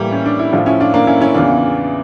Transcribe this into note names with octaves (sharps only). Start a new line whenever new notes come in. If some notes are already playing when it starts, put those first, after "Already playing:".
Already playing: A2 E3 G3 A#3
C#4
D4
E4
A2 F3 D4 F4
C#4 E4
D4 F4
A#3 D4
C#4 E4
C#4 E4
E2 C#3 E3 D4 F4